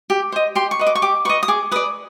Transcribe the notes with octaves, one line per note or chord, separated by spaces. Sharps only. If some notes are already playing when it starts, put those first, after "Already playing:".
G4
C5 D#5
G4 C6
C#6
B4 D#5
D6
C#6
G4 D6
B4 D#5 C#6
D#6
G#4 D6
B4 D5 D#6